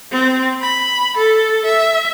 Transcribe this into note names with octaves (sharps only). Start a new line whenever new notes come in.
C4
B5
A4
E5